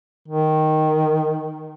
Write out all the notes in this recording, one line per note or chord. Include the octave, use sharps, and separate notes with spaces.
D#3